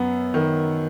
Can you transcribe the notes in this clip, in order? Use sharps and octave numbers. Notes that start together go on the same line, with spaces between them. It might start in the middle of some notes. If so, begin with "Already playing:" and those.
Already playing: F#2 B3
D#3